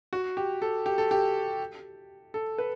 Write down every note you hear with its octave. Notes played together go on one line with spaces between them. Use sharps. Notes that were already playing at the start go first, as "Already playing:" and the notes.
F#4
G4
A4
G4
A4
G4
A4
B4